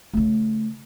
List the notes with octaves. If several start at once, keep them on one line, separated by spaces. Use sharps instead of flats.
C#3 A3